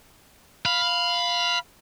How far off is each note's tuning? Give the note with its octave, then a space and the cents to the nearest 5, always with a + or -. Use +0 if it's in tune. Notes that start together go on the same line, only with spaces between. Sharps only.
F5 +0 B5 +0